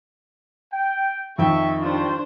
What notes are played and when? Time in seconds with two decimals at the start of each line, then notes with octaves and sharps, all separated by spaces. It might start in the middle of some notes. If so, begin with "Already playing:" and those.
0.72 G5
1.38 F2 D#3 E5 G5 C#6
1.82 G3 D4 F4 C5 C#6